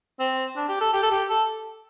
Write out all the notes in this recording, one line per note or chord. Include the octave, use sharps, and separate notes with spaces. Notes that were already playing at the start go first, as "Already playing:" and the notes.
C4
D4
G4
A4
G4
A4
G4
A4